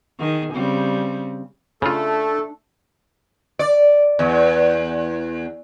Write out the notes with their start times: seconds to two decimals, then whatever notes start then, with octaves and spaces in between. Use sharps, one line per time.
0.19 D#3 G#4
0.54 C#3 G3 C4
1.82 C#3 A3 D4 F4 A4
3.59 D5
4.19 E2